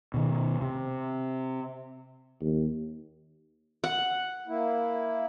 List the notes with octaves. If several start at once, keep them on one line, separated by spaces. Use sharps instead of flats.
B2 D#3
C3
D#2
F#5
A#3 E4